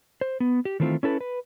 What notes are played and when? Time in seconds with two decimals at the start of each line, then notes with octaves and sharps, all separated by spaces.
0.21 C5
0.40 B3
0.65 G4
0.80 D#3 E3 A3 C4 F4
1.03 C#4 E4 A4 B4
1.21 B4